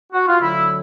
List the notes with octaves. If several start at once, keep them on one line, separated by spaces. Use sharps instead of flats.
F#4
F4
D2 D3 F#3 E4